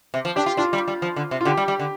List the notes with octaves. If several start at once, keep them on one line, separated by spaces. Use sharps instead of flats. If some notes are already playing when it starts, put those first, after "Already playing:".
C3
F3
D4 G4
F4
D4 F4
G3
G3
F3
D3
C3
F4
D3 G4
G3
G3
D3